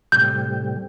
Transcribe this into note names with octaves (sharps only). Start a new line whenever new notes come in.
A2 C3 G3 G6